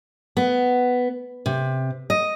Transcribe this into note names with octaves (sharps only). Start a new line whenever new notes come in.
B3
C3
D#5